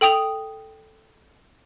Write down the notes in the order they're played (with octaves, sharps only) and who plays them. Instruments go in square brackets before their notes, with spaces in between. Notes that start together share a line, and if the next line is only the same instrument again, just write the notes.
[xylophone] A4 G5 D#6 F7